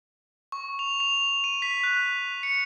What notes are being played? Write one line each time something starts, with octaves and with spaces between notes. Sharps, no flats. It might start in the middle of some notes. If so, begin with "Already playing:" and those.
C#6
F7
F7
F7
D#7
B6
F#6
C#7